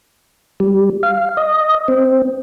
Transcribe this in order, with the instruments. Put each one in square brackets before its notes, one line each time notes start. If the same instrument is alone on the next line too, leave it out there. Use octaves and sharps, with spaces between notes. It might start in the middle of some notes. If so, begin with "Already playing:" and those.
[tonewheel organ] G3
F5
D#5
C4